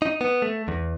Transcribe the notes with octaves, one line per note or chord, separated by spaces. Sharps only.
D#4
B3
A3
E2